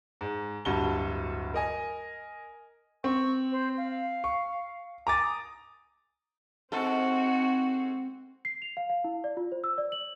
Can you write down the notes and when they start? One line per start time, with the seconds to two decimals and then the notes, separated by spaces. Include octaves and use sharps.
0.21 G#2
0.65 D1 G2 F#4 A5 G7
1.54 A#4 D#5 G#5
3.04 C4 C#6
3.52 C5
3.78 F5
4.24 C#6
5.07 G#5 A#5 D6 A6
5.22 D#6
6.72 G#2 C4 F#4 A4
8.45 C7
8.62 F7
8.77 F5
8.90 F5
9.04 E4
9.24 D5
9.37 F4
9.52 C5
9.64 E6
9.78 D5
9.92 F#7